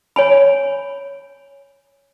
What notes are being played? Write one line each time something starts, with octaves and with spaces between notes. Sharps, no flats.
C#5 G#5 B5